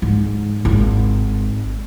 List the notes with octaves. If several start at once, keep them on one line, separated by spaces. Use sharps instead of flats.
G#2
G#1